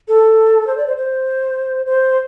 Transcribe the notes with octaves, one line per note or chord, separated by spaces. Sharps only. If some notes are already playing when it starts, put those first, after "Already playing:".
A4
C5
D5
C5
C5
C5